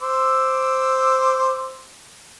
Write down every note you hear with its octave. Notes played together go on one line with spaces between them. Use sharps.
C5 D6 E6